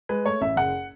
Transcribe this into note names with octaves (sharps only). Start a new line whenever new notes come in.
G#3 B4
A3 C#5
A1 E5
F#1 F#5